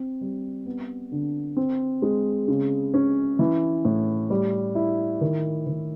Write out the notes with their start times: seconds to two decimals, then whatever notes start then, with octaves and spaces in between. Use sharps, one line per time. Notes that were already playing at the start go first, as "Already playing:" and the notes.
Already playing: C4
0.21 G3
0.66 B3
1.12 D3
1.57 C4
2.02 G#3
2.48 C#3
2.94 C#4
3.39 E3
3.85 A2
4.30 G3
4.75 E4
5.21 D#3
5.67 D#3